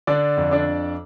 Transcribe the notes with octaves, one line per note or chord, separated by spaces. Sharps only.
D3 D4 D5
F2
D4 D5